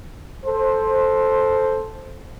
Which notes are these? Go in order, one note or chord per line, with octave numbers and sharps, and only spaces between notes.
A4 C5